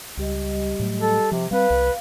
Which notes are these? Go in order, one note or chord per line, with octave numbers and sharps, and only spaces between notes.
C#2 G3 G4 D#5
A2 F#3 A3
A4
C3 F3
G3 C4 B4 F5
C2